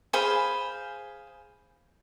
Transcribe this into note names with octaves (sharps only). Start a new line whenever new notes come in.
G#4 C5 F5 B5